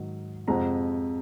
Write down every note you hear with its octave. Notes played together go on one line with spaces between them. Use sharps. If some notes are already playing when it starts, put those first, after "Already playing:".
Already playing: G#2 D#3 F#3
F2 C3 F3 G#3 C4 F#5 A#5